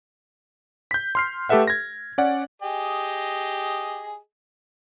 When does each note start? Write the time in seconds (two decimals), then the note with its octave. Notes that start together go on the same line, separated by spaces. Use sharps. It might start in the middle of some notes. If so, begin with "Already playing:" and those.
0.91 G6 B6
1.15 C6 F6 C7
1.49 A3 G4 A4 B4 E5 F#5
1.67 G#6 A#6
2.18 C#4 D5 F#5
2.62 G4 G#4 D#5